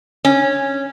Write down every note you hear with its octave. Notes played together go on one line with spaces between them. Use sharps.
C#4